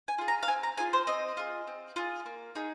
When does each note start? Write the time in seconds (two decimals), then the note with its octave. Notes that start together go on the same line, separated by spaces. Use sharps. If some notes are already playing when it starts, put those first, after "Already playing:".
0.08 G#5
0.18 F4 G#4
0.28 A#5
0.43 F5
0.47 C4 G#5
0.63 A#5
0.77 F4 G#4 G#5
0.93 C5
1.07 C4 D#5
1.37 F4 G#4
1.67 C4
1.96 F4 G#4
2.26 A#3
2.55 D#4 G#4